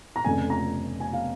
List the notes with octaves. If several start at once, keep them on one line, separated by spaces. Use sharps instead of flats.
A#5
F1 F2 C#3 G#5
A#5
G#5
F5